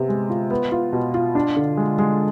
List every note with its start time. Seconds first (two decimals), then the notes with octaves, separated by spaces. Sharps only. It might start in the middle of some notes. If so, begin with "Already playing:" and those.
Already playing: C3 B3
0.09 G#3
0.30 F4
0.51 B3
0.72 F4
0.93 B2
1.14 F4
1.35 D4
1.56 D3
1.77 G#3
1.99 G#3